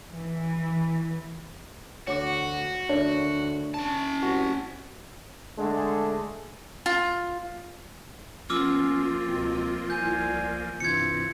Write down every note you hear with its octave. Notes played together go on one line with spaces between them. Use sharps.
E3
D2 F#4 C#5 F#5 D6
D2 D4 A#4 C#5 E5
C#4 A5
C2 F#4
D3 G#3 A3 D4
F4
F3 A#3 B3 C#4 F4 D6 E6 F6
C#2 B2 C4
C2 G#5 G6
G2 C3 E3 F4 G#6 C#7